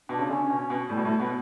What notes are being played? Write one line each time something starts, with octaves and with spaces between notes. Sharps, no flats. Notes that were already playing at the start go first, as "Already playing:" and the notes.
B2 D4
C#3
D3 C#4
C#4
B2
C#4
B2
A2 G3
B2
A2 A3
B2 B3